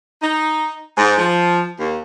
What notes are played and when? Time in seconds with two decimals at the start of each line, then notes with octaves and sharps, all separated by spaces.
0.22 D#4
0.97 G#2
1.18 F3
1.79 D#2